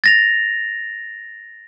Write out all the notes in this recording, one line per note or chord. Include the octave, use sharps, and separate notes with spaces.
A6 A#6 F7